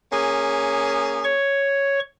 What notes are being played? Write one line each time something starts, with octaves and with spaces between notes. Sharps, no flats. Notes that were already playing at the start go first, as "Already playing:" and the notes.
A#3 C#4 G#4
C#5 C#6